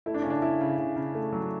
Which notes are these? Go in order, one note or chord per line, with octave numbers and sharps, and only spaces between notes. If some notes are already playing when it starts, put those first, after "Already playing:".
A3 E4
D4
C#3 C#4
D4
C#3 E4
C#3
C#3
C#3
A3
F#3